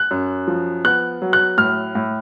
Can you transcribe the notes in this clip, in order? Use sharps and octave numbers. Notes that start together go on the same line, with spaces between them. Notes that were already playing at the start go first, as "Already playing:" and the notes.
Already playing: F#6
F#2
F3
B3 F#6
F#3
F#6
A2 F6
A2